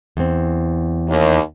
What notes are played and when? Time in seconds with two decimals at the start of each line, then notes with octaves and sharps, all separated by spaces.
0.17 E2 C4
1.09 D#2